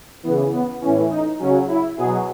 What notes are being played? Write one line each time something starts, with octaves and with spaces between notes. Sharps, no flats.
C#3 E3 B3
B3
A2 E3 C#4
D#4
C#3 F#3 C#4
E4
B2 F#3 G#4